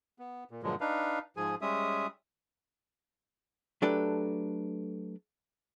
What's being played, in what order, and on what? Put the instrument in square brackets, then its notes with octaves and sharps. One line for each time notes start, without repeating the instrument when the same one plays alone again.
[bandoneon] B3
A#2
G2 A#2 D3 F3 F#3 G#3
D4 D#4 B4 F5
G#2 F3 G#4 G#5
G3 G#3 C#4 E5 D#6
[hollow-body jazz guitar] F#3 A3 D4 G4 A4 B4